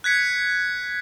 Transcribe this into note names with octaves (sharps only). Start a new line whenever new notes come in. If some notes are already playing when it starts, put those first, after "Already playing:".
F#6 G#6 B6 C#7